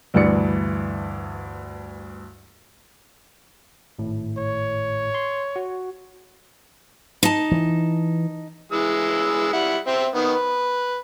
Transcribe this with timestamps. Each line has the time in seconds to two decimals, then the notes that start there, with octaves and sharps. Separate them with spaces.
0.14 D2 G2 E3 D5 C#7
3.99 G#1 A2
4.37 C#5
5.14 C6
5.56 F#4
7.23 D#4 A5
7.52 E3
8.72 E3 G#3 E6
9.53 G3 E4 F#5
9.87 C4 E5 G5
10.15 D#3 B3
10.35 B4